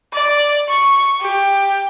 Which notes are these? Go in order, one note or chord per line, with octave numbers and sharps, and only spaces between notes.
D5
C#6
G4